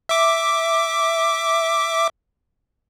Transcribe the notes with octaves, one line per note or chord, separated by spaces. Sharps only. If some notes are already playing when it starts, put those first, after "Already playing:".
E5 D6